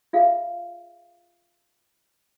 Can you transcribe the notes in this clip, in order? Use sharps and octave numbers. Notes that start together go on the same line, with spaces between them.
F4 G#4 E5 F5